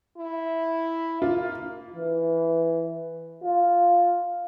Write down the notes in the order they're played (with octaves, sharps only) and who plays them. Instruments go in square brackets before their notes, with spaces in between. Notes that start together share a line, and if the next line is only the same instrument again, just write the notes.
[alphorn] E4
[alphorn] A#3 [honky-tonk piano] F4
[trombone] E3
F4